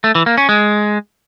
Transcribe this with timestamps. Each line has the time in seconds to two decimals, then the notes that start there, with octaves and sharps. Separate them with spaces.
0.04 A3
0.15 E3
0.26 A#3
0.38 C#4
0.49 G#3